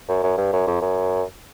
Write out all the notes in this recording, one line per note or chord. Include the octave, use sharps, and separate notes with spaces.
F#2
F#2
G2
F#2
F2
F#2